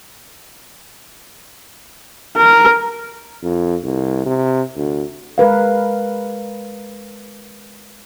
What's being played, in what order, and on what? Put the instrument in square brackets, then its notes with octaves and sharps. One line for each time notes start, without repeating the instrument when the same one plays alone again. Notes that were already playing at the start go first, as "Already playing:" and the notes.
[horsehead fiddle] A#4
[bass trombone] F2
C2
C3
D2
[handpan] G#3 A#4 B4 F5